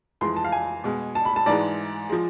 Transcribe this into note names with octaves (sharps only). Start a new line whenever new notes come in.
F2 E3 G#3 C6
A5
F5
G#5
B2 G#3
A5
B5
A5
G#2 E3 G#3 D5
F3 G#3